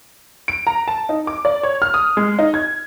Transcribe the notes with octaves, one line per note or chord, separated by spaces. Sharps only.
D7
A#5
A5
D#4
D6
D5
C#5
F6
D#6
G#3
D#4
G#6